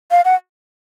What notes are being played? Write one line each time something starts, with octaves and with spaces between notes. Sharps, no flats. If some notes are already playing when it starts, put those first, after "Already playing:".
F5
F#5